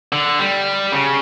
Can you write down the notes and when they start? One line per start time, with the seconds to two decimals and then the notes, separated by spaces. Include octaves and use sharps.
0.13 D3
0.39 G3
0.92 C#3